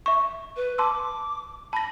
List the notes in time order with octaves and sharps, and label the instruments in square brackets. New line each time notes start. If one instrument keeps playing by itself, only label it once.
[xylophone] E5 C#6
[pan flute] B4
[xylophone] A5 C6 E6 [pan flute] D6
[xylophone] A5 A#6 [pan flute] B5